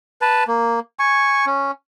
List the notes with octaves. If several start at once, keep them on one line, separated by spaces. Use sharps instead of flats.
B4 A5
A#3
G#5 C#6
C#4